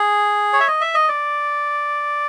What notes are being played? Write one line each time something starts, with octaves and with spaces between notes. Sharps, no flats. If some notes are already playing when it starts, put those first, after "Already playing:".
Already playing: G#4
C#5
E5
D#5
E5
D#5
D5